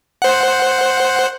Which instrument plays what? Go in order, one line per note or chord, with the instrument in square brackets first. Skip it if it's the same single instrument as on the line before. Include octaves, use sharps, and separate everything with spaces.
[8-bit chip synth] C5 F#5